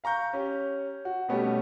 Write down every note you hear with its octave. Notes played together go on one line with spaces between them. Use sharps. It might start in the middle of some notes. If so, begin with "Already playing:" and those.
F5 A#5 C#6 G6
C#4 G4
F#4
B2 G3 A3 B3 C#4 G4